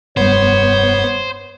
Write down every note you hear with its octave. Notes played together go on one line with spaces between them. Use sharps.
F1 G2 B3 C5 C#5